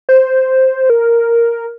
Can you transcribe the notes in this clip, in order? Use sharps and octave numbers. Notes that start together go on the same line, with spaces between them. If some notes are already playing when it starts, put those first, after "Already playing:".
C5
A#4